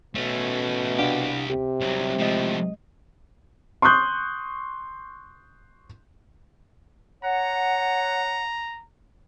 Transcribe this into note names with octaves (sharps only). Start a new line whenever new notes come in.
B2 A3 C#4
C2 D4 G4 F5 F#5
C3 G4
C2 F#3
A2 F3 G#3 D#5
C6 C#6 D#6 F#6 G6
C#5 F#5 A#5